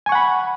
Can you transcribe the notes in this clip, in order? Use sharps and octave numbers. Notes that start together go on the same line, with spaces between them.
F#5 G#5 B5 C#6